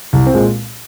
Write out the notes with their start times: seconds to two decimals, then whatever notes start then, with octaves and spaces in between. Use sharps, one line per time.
0.13 C2
0.27 C4
0.34 A#2 G#3